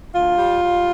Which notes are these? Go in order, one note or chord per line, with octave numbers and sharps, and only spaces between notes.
D2 F4
G3
G3